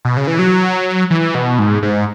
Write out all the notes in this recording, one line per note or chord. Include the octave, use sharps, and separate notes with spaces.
B2
C#3
E3
F#3
E3
B2
G#2
G#2